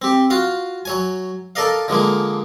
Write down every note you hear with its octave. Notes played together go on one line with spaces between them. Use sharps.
C4 G4
F4 F#4 F5
F#3 C#5 G#5
A4 A#4 D5 D#5 F5
D3 F3 G#3 A#3